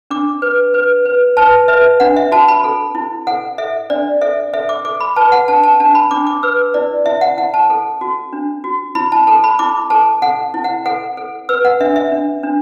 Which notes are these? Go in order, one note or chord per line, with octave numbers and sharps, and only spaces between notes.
D4 D6
B4
B4
B4
B4 A5
B4 E5
D4 F#5
E5
F#4 A5
B5
A4
E4
A4 F#5
A4 E5
D4 D5
A4 E5
A4 E5
D6
A4 D6
B5
B4 A5
F#5
D4 A5
A5
D4 A5
B5
D4 D6
D6
B4 E6
E4 D5
E4 E5
F#5
E4 F#5
A5
A4
F#4
D4
F#4
E4 B5
A5
A4 A5
B5
E4 D6
A4 A5
A4 F#5
E4
F#5
A4 F#5
A4
B4 E6
F#5
D4 E5
E5
D4
D4